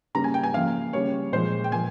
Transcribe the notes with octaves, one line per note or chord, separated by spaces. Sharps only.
C#3 G3 A#3 A#5
G#5
G5
G#5
C#3 F3 A#3 F5
C#3 G3 A#3 C#5
A#2 F3 G#3 C5
G5
A#2 F3 A#3 G#5